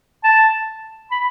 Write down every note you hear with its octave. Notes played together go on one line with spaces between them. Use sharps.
A5
B5